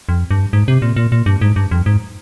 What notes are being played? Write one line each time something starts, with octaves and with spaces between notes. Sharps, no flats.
F2
G2
G#2
C3
A#2
A#2
A#2
G2
G#2
G2
F2
G#2